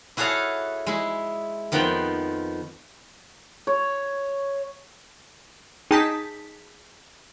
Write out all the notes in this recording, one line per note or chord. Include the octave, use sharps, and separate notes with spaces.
E4 F#4 G#4 A4 C#5 F5
G#3 E4
F2 D#3 F3 B3 G5
C#5
D#4 G#4 G5 A5 D#6 B6